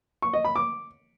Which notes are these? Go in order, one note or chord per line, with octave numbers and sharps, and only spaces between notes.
C#6
D#5
B5
D6